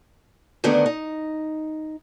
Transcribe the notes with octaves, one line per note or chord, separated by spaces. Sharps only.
D3 D#3 A3 B3 D4 A#4
D#4